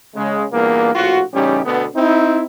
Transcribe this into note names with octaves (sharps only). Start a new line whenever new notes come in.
C#3 G#3
E2 G2 A#2 A#3
A#1 A2 F4 F#4
A1 C#3 G3 C#4 D#4 G4
D2 B2 D3 B3
C4 D#4 E4